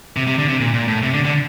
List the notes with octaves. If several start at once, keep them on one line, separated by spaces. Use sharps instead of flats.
C3
C3
D3
C3
A#2
A#2
A2
C3
D3
D3